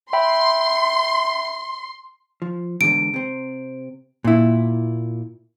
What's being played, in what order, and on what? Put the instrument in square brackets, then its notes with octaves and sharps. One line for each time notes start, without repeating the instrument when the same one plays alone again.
[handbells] E5 G5 B5 [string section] C6
[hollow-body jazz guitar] F3
[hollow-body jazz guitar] E2 G#2 D3 [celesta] D7
[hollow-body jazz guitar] C3 C4
A#2 E4